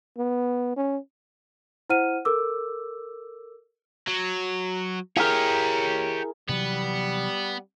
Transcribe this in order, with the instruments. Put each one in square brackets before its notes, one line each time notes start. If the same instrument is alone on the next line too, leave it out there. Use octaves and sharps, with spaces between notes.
[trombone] B3
C#4
[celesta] E4 C5 F#5 F6 D#7
A4 A#4 D6 E6
[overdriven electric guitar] F#3
[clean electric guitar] E4 G#4 A#4 [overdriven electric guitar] G4 C#5
[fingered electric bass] C3 E3 F#3 [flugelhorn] G3 [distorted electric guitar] B3